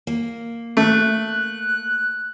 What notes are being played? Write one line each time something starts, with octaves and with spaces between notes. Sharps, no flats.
A#3
A3 F#6